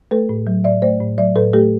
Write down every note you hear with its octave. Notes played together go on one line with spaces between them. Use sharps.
A3 A4 B4
A2
F#3
A2 D5 E5
A3 C5 D5
A2
F#3 D5 E5
A2 A4 B4
A3 G4 A4